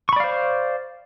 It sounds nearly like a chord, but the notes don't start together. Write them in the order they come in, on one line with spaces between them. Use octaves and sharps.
C#6 B5 D5 F5 C5